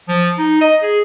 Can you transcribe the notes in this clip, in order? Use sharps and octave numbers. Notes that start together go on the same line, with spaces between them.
F3
D#4
D#5
G#4